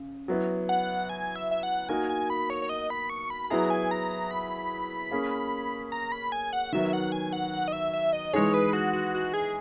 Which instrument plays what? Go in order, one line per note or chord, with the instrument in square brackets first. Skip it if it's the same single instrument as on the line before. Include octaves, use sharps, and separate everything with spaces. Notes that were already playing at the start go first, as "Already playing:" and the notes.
Already playing: [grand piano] C#3
F#3 B3 E4
[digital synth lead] F#5
G#5
E5
E5
F#5
[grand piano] A#3 D#4 F#4 A#4 [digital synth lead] G#5
[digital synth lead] G#5
B5
C#5
C#5
D#5
B5
C#6
B5
B5
[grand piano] F#3 B3 E4 G#4 [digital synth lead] A#5
[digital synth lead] G#5
A#5
A#5
B5
[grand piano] A#3 C#4 G#4
[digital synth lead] A#5
B5
G#5
F#5
[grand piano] D#3 F#3 B3 [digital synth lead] E5
[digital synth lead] F#5
G#5
F#5
F#5
D#5
E5
E5
D#5
[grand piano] E3 G#3 D#4 G#4 [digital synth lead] C#5
[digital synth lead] B4
F#4
F#4
F#4
G#4